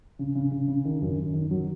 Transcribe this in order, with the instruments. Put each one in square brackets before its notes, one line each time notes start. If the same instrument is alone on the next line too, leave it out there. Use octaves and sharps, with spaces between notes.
[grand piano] C#3
C#3
C#3
C#3
D#3
F#2
F#2
D#3
F#3